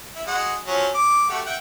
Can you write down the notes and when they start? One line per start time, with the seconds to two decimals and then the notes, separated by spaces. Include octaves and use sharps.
0.15 E4
0.27 G#3 F#4 F#5
0.67 F3 F#3 C#4
0.95 D6
1.30 A3 F#4 G4
1.46 E5 F#5 G5